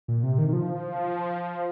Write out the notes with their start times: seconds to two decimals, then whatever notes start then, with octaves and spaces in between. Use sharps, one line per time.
0.08 A#2
0.23 C3
0.38 D#3
0.49 D#3
0.53 F3